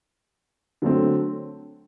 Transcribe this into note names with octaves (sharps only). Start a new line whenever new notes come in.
D3 F#3 A3 C4